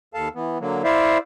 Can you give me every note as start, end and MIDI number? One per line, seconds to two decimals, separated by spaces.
0.14 0.28 39
0.14 0.28 69
0.14 0.28 77
0.14 0.28 81
0.35 0.58 52
0.35 0.58 59
0.60 0.83 50
0.60 0.83 54
0.60 0.83 58
0.84 1.18 64
0.84 1.18 72
0.84 1.18 74
0.84 1.18 76
0.84 1.18 77